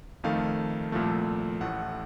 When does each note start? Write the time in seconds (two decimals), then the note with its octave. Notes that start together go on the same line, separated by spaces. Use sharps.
0.24 F2 D#3 A3 F5
0.92 C2 A#2 F3 A3
1.61 A1 A2 A3 F#5